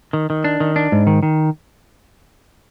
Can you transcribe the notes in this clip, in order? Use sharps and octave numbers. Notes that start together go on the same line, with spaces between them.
D#3
D#3
D4
D#3
D4
G#2
D#3
D#3